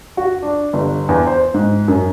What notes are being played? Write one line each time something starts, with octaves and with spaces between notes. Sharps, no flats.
F#4
D4
G1
E2
C5
G#2
F#2